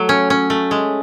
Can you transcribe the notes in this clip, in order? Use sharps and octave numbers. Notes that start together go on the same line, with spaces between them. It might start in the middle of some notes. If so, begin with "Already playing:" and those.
Already playing: F#3 A3
C#4
C#4
A3
G#3